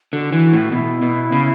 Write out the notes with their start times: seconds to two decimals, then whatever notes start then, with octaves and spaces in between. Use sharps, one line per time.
0.13 D3 F#4
0.32 E3
0.43 F#4
0.53 A2
0.72 B2 E4
1.02 B2
1.32 C#3